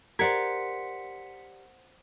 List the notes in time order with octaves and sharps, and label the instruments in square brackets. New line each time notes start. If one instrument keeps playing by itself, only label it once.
[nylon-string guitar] G4 D5 [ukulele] A#4 [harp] C5 F#5 G#6 [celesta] B6 C#7